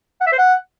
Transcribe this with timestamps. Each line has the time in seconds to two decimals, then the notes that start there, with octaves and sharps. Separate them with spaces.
0.21 F#5
0.27 E5
0.33 C5
0.38 F#5